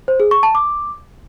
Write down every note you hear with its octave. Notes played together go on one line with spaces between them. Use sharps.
C5
G#4
C#6
A5
D6